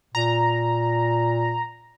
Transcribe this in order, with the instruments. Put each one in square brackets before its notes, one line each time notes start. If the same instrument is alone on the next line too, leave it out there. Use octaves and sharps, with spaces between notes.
[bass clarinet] A#2 [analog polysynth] A#5